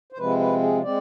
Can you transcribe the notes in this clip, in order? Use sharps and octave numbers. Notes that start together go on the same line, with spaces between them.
C5
C3 F3 G#3 C4 B4
B4
G#4
G#3 C4 D5